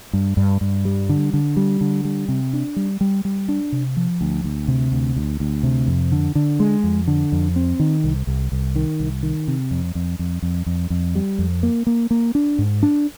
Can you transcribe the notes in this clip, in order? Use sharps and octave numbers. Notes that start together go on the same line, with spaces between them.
G2
G2
G2
G3
D3
D3
G3
D3
G3
C3
D4
G3
G3
G3
D4
C3
F3
D2
D2
C3
D2
D2
D2
C3
F2
D3
D3
G#3
F2
D3
F2
C4
D#3
C2
C2
C2
D#3
C2
D#3
C3
F2
F2
F2
F2
F2
F2
G3
F2
A#3
A#3
A#3
D4
G#2
D4